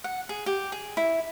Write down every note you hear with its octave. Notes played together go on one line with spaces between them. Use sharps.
F#5
G#4
G4
G#4
E4